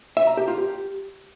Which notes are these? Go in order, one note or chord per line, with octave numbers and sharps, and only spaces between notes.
E5
A#5
G4
F4
G4